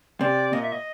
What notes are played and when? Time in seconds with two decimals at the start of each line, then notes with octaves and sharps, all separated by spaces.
0.21 C3 D5
0.53 A#2 D#5
0.63 E5
0.72 D#5